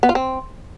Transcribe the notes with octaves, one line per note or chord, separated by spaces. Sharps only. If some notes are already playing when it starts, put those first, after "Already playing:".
B3
F4
C4